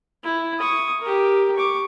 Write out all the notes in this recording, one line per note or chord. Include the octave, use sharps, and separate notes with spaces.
E4
C#6 D#6
G4 A#4
C#6 D6